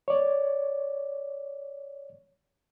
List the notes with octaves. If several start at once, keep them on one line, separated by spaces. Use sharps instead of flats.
C#5 D5